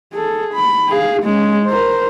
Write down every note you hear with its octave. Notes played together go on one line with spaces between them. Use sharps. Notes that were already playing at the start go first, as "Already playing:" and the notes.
G#4 A4
B5
G#4 F5
G#3 C#4
A#4 C5